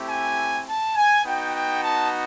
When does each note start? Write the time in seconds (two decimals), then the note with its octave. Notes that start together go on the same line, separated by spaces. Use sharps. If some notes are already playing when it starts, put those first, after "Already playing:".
Already playing: A3 C4 E4 G4
0.09 G#5
0.67 A5
0.96 G#5
1.25 B3 D#4 F#4 G5
1.54 G5
1.84 A5